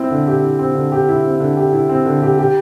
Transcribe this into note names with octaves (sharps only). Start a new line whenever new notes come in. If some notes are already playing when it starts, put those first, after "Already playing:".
Already playing: C4 E4
D3
G4
E4
C4
D3
G4
E4
C4
D3
G4
E4
C4
D3
G4
G4